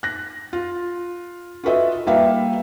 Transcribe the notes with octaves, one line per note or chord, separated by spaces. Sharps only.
F#6 A#6
F4
F4 F#4 A4 B4 D#5 E5
G3 A#3 G4 B4 E5 F5